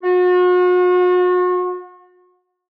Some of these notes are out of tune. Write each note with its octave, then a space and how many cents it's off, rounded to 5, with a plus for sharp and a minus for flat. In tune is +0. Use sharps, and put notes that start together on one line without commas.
F#4 -40